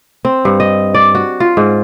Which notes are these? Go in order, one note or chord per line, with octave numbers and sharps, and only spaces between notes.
C4
G2
D#5
D5
F#4
F4
G#2